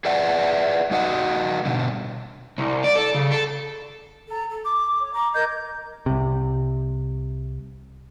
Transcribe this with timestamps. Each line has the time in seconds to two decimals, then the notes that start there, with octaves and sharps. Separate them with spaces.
0.05 G#4 B4 D5 E5 F#5
0.91 G3 D#4 F#4 D#5 F5 F#5
1.65 B2 D3
2.58 C2
2.84 D5
2.96 A4
3.15 C#3
3.31 A4
4.29 A4 A#5
4.48 A4
4.64 D6
4.99 C#5
5.13 A#5 D6
5.33 A#4 D#5 G6 G#6
6.06 C2 C3